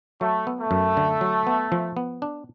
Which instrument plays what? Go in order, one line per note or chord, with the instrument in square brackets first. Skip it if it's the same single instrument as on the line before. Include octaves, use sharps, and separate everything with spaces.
[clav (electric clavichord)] F#3 [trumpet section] A3
[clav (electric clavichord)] B3
[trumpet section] A3
[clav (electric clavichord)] F#2
D3
F#3
B3
F3
B3
D4